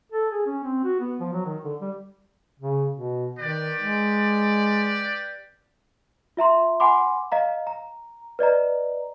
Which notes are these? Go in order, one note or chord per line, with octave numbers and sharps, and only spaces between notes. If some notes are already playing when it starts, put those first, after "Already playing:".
A4
G#4
C#4
C4
F#4
B3
F3
F#3
D#3
D3
G3
C#3
B2
D#3 G4 B4 D5
G#3
F4 E5 A#5 C6
F#5 G#5 B5 C6 D6
D#5 F5 A#5
A#5
B4 D5 D#5 A#5